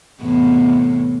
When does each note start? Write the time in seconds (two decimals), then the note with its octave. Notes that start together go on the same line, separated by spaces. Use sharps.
0.22 E2 A2 C3